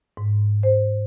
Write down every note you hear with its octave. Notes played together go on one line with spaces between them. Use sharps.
G#2
C5